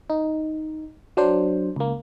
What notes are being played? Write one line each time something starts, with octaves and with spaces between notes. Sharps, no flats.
D#4
F#3 D4 C5
C#2 A#3